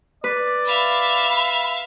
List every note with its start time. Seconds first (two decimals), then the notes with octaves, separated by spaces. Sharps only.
0.24 B4 D5
0.66 E5 F5 B5